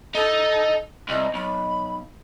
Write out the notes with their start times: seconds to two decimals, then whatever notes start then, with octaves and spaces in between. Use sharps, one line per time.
0.15 D#4 A4 D#5
1.09 C2 D#5
1.34 B1 B5